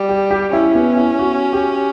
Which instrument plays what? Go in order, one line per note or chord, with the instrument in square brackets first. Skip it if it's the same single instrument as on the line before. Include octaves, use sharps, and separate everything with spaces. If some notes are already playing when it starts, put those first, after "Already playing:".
Already playing: [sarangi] G3
[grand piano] G4
G4
[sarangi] C#4 [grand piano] E4
[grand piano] B3
E4
F#4
G4